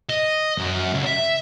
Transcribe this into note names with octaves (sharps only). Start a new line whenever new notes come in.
D#5
F#2
C#2
E5